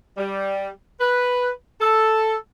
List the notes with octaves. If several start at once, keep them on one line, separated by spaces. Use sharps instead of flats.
G3
B4
A4